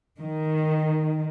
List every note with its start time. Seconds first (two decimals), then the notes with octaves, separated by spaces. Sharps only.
0.20 D#3